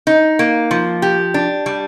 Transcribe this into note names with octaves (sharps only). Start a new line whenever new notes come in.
D#4
A#3
F3
G4
D4
G3